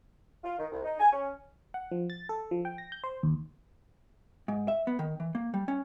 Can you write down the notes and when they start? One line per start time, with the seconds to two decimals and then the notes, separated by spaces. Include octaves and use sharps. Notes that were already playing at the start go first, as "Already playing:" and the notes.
0.44 F4
0.58 D#3
0.71 C2
0.84 D#4
1.00 G#5
1.12 C#4
1.74 F#5
1.91 F3
2.10 A6
2.29 A4
2.51 F3
2.65 G5
2.78 A#6
2.92 G6
3.04 C5
3.23 D#2
4.48 G#2
4.68 E5
4.87 B3
4.99 D#3
5.20 E3
5.35 A#3
5.54 G3
5.68 C#4